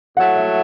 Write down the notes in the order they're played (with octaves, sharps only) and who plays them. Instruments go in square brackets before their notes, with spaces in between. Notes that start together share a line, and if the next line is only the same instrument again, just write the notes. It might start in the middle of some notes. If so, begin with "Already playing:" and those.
[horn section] A2 F#3 A3 [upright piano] F#5
[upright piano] E5